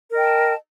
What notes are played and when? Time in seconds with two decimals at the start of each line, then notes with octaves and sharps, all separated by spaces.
0.10 A#4
0.14 D#5
0.19 G5
0.23 A5